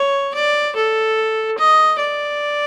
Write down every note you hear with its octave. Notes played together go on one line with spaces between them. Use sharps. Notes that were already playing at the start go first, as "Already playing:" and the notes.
Already playing: C#5
D5
A4
D#5
D5